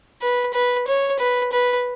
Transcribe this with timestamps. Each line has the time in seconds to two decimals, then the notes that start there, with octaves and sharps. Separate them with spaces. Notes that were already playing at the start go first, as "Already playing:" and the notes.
0.22 B4
0.54 B4
0.87 C#5
1.19 B4
1.52 B4